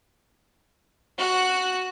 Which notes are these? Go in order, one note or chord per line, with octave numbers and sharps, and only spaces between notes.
F#4 F#6